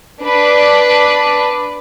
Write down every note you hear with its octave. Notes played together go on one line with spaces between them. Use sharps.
D4 B4 D5